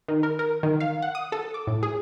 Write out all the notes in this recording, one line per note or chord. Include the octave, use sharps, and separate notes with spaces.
D#3
A#4
A#4
D#3
F5
F#5
D#6
A4
D6
A2
G#4